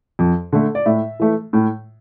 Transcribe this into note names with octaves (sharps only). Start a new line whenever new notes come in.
F2
D3 A3
D5
A2 E5
E3 A3
A2